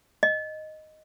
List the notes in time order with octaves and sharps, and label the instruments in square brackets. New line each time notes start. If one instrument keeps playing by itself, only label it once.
[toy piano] D#5